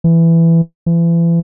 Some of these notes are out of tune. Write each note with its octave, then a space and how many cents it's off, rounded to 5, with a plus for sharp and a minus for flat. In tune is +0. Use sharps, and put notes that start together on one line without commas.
E3 +10
E3 +35